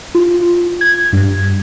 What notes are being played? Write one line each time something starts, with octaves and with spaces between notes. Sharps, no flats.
F4
G#6
G2